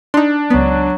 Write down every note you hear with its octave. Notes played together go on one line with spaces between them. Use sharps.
D4 D#4 C6
C#2 F#3 B3